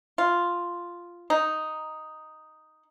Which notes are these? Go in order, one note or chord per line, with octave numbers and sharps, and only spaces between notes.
F4
D#4